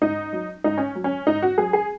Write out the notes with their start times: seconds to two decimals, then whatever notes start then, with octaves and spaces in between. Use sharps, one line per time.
0.02 G#2 D#4
0.33 F#3
0.64 G#2 D#4
0.78 C#4
0.95 F#3
1.04 C#4
1.27 G#2 D#4
1.42 F#4
1.58 F#3 G#4
1.73 G#4